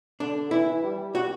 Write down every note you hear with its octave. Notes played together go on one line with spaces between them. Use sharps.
D3 D4
E3 E4
G3
F#4